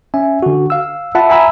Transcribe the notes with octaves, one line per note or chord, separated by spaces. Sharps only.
C#4 E5 G#5
D3 F#4
F5 E6
F4 E5 F#5 A5 B5
E5 G#5 A#5 B5 E6